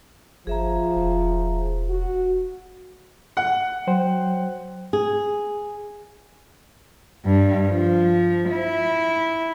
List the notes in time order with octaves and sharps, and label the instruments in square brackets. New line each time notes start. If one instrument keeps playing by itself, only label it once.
[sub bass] G1 [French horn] F3 [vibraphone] G#4 E5 A#5
[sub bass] E1
[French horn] F#4
[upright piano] F#5
[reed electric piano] F#3 C5 G5
[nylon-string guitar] G#4
[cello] G2
F3
E4